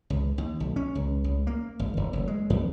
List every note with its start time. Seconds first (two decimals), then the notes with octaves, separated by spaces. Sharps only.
0.10 C#2
0.38 D#2
0.60 B1
0.76 C#4
0.95 C#2
1.24 C#2
1.47 A#3
1.79 G#1
1.97 E1
2.13 F#1
2.27 G#3
2.50 F2